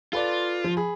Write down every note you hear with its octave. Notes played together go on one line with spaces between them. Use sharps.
F4 A4 B4 D5
F3
G#4 B5